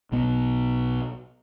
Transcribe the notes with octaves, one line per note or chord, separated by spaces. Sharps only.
B1 B2 B3